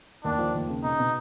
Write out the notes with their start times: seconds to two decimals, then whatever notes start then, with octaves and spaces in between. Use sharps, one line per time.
0.24 D#2 D4
0.38 F3
0.54 D#2
0.69 C#3
0.83 B2 D#4
0.99 B2